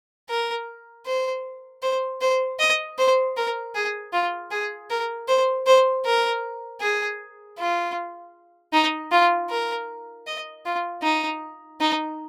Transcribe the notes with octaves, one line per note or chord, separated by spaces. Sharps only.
A#4
C5
C5
C5
D#5
C5
A#4
G#4
F4
G#4
A#4
C5
C5
A#4
G#4
F4
D#4
F4
A#4
D#5
F4
D#4
D#4